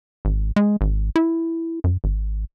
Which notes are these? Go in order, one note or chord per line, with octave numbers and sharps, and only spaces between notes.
G#1
G#3
G#1
E4
F#2
G#1